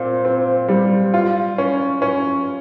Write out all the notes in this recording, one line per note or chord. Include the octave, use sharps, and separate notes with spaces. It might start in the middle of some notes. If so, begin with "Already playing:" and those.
Already playing: A#2 C4
C4
G3
F4
C#4
C#4